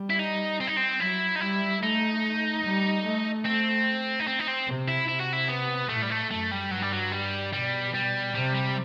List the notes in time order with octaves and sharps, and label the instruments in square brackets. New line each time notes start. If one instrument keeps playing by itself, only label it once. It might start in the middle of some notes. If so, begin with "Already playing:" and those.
Already playing: [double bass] G3
[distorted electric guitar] E4
D#4
C4
D#4
C4
[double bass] F#3 [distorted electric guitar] E4
[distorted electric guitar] D#4
[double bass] G3 [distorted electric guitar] E4
[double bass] A3 [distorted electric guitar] D#4
[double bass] G3
A3
[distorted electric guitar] C4
D#4
C4
D#4
C4
[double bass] C3
[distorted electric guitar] E4
[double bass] C3 [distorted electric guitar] E4
[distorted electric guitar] F#4
E4
B3
[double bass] A2 [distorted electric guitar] A3
[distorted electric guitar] G3
A3
[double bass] F#2 [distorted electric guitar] A3
[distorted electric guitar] G3
[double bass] G2 [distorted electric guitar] F#3
[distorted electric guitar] G3
F#3
G3
[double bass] B2 [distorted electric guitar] G3
[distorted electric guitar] G3
[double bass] C3 [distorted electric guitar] G3
[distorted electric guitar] G3